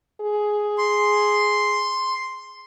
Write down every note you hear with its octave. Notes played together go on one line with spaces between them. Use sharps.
G#4
C6